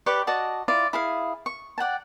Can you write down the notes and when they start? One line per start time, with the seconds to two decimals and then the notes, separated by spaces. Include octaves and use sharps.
0.06 G4 B4 D5 C#6
0.27 F#4 D5 D#5 A5
0.68 E4 F4 D5
0.93 E4 G#4 F5
1.46 C#6
1.78 D5 F#5 G5 A5